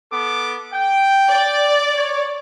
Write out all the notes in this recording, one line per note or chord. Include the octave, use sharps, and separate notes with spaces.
B3 A4 D6
G5
D5
C#5